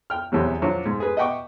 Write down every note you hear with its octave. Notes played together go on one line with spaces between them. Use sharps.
G5 F6
E2 C3 F#3 G3
F3 F#3 D4 E4
G#2
G#4 B4
D#5 E5 F#5 G5 C#6 D6